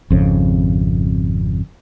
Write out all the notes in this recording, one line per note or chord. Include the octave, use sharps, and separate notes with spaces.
G#1 F2 C#3